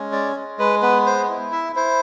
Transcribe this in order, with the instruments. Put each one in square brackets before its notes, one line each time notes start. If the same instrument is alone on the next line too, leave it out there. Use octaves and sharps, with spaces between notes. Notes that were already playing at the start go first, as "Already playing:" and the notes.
Already playing: [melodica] G#3 C#4
D5
G#3
B4
B3 B4
C5
E4
E5
E4 C5